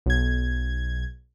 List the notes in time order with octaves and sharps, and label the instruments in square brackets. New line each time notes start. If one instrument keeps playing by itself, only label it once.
[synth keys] B1 G#6